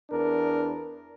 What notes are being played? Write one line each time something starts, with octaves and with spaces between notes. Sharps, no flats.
E2 D4 A#4